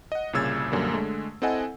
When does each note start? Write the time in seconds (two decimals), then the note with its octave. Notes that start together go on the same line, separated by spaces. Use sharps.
0.12 D#5 F#5
0.33 C2 A#2 C#3 E6 G#6 A6
0.72 A#1 F#2 D3 G3 A#3
0.93 D3 G#3 A3
1.42 C4 E4 A4 D#5 F#5 G#5